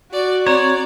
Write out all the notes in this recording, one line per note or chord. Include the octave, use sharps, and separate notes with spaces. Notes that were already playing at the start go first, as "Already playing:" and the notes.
F#4 D5
C4 C#5 D5 A#5